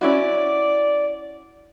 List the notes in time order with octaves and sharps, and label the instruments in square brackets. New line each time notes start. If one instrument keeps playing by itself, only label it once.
[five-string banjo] C#4 E4 F#4 [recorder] D5